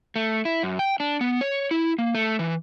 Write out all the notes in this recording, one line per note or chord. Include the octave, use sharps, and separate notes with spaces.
A3
E4
F#2
G5
D4
B3
C#5
E4
A#3
A3
E3